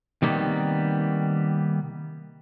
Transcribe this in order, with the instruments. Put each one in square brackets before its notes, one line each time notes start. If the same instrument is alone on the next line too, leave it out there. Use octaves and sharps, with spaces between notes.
[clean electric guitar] C3 D#3 G3 A#3 B3